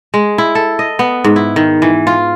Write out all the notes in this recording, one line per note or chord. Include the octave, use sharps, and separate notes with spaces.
G#3
E4
A4
D#5
B3
G#2
E4
D#3
E3
F4